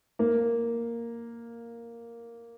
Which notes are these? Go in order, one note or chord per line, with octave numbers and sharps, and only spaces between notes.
A#3